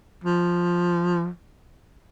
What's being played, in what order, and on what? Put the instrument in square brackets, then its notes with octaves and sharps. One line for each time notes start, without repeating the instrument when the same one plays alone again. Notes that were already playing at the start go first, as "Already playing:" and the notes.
[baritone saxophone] F3